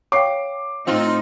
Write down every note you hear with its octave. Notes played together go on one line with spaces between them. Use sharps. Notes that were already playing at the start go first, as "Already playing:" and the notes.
C#5 F5 G5 D6 C7
A2 C4 D#4 F4